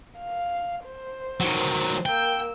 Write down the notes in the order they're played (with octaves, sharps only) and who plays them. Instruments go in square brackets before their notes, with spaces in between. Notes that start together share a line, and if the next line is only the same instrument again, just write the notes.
[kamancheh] F5
C5
[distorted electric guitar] D#3 F#3
[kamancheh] A#3 E6 [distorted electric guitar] G5